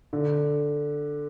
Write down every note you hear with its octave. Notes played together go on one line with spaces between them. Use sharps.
D3